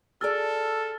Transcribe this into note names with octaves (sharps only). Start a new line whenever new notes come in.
F#4 G#4 A4 D5 E6 F6 A6